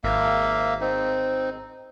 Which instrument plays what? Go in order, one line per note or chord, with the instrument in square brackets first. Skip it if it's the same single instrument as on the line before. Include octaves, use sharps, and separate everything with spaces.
[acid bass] G#1 [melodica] A#3 E5 F5
[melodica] C4 D#4